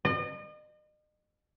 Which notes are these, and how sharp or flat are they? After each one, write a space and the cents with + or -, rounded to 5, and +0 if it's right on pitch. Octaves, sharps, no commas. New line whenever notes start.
D#5 -40